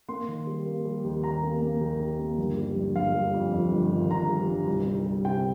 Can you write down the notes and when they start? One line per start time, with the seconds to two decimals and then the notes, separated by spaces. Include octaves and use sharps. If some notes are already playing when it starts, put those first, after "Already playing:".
0.09 A#3 C6
0.28 D#3
0.47 G3
0.66 A#3
0.85 G3
1.04 D#2
1.23 D#3 A#5
1.43 A#3
1.62 A#3
1.81 D#2
2.00 D#2
2.19 A#3
2.38 G1
2.57 G3
2.76 G1
2.95 G1 F5
3.15 G3
3.34 F2
3.53 F2
3.72 G1
3.91 D#3
4.10 G1 A#5
4.30 G3
4.48 G1
4.68 C2
4.87 C2
5.06 G3
5.25 C3 G5